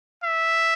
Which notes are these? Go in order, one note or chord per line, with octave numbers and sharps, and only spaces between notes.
E5